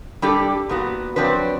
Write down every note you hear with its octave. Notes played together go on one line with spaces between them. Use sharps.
G3 D4 G4 A4
A#2 B3 F#4
F3 F#3 C4 D4 B4